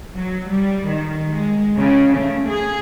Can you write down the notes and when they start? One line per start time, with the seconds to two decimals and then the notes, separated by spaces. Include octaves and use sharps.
0.15 F#3
0.49 G3
0.86 D#3
1.29 G#3
1.78 C#3
2.17 A3
2.47 G#4